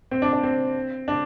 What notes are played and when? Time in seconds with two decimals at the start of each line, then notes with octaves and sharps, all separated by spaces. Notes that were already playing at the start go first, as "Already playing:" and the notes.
0.11 C4
0.22 D4
0.33 D4
0.43 C4
1.08 D4